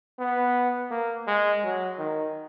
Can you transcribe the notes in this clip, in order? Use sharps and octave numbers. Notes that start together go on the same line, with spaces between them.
B3
A#3
G#3
F#3
D#3